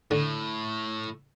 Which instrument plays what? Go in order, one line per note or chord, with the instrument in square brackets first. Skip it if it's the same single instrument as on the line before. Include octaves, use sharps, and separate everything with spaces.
[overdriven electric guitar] A2 [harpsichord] D3